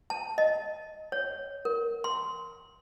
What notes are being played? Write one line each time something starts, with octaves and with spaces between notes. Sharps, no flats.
A5
D#5
C#5
A#4
C6